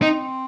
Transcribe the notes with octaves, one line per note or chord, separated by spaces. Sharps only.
C4 D#4